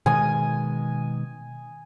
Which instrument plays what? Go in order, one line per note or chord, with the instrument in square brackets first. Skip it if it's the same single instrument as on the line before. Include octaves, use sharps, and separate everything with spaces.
[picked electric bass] B2 D#3 G#3 [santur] G#5 D#6